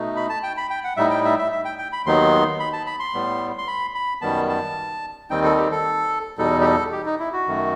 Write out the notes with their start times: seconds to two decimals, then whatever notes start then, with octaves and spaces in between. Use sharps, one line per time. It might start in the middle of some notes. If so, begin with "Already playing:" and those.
Already playing: B2 A3 D#4
0.16 B5
0.29 A5
0.43 G5
0.57 B5
0.70 G5
0.84 F#5
0.97 A2 G3 D#4 E5
1.11 G5
1.25 E5
1.38 E5
1.52 E5
1.65 G5
1.79 G5
1.93 B5
2.06 D#2 D#3 F#3 B3 D#4 C6
2.60 B5
2.73 A5
2.86 B5
3.00 C6
3.14 A2 G3 B3
3.58 C6
3.68 B5
3.95 B5
4.21 F#2 D#3 G3 B3 A5
4.49 A5
5.30 D#2 D#3 G3 C4 D#4 G5
5.44 A4
5.57 G4
5.71 A4
6.38 E2 B2 G3 D#4 A4
6.61 G4
6.65 A4
6.92 G4
7.06 D#4
7.20 E4
7.33 F#4
7.47 F#2 D#3 A3